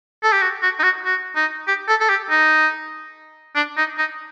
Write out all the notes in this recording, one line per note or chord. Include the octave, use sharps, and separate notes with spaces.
A4
G4
F#4
F#4
D#4
F#4
F#4
D#4
G4
A4
A4
G4
D#4
D4
D#4
D#4